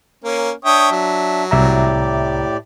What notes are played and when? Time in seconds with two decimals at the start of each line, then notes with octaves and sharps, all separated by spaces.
0.24 A#3 C#4
0.65 D4 C#5 E5 G5 D#6
0.91 F#3
1.51 C2 A2 G4 D5 E5 A#5